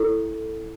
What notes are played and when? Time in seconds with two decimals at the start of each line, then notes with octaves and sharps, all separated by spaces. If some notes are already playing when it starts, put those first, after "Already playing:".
Already playing: E4 A4